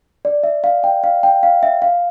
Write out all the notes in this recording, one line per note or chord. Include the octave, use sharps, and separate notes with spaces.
D5
E5
F5
G5
F5
G5
F5
E5
F5